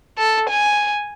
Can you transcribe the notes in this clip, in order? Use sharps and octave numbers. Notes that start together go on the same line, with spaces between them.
A4
G#5